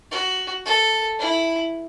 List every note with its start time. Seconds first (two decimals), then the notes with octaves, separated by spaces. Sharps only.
0.11 F#4
0.66 A4
1.19 E4